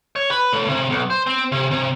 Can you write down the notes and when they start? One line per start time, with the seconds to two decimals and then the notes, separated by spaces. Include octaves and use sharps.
0.16 C#5
0.31 B4
0.53 A2
0.69 C3
0.90 B1
1.10 C5
1.27 C4
1.52 C3
1.71 C3